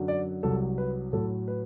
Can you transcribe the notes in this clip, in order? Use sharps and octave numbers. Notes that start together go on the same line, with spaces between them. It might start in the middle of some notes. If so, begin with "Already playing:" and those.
Already playing: F#2 D3 F#3
D5
C2 C3 F#3 A4
B4
A2 F#3 A4
B4